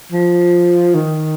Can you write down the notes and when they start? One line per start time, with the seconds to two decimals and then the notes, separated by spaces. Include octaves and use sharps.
0.12 F3
0.94 D#3